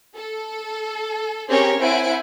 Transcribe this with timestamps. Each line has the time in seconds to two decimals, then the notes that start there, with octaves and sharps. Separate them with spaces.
0.16 A4
1.48 C4 C#4 G4 G#4 A#4 C#5
1.81 C4 E4 C5 F#5 G#5 D7